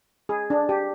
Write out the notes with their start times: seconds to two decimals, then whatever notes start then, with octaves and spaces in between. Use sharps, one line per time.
0.29 G#4
0.50 D4
0.69 G4